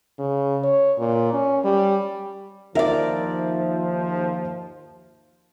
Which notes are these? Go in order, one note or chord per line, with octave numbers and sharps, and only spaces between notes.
C#3
C#5
A#2
C#4
G3
D#2 F3 D#4 A#4 D5 E5